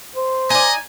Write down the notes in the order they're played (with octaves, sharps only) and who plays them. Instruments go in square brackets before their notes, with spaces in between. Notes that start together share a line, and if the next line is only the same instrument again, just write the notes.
[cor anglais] C5
[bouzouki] D#4 D5 [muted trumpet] D#5 [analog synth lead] G#5